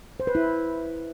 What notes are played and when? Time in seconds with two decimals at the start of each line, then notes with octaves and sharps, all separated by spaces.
0.20 C5
0.27 B4
0.35 E4